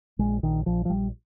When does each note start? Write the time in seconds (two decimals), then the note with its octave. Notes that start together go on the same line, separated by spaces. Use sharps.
0.19 A#1 G#3
0.43 A#1 D#3
0.66 A#1 F3
0.85 F3
0.90 A#1 G3